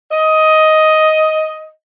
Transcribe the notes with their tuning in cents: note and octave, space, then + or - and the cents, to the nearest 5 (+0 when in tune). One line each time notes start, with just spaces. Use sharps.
D#5 +10